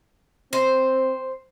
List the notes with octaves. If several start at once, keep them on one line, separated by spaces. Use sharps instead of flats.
C4 C5